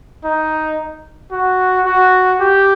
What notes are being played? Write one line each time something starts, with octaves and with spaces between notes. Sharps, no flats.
D#4
F#4
F#4
G4